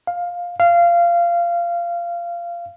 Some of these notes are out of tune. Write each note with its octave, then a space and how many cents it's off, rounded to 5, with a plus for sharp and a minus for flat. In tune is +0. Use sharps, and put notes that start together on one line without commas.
F5 +10
F5 -20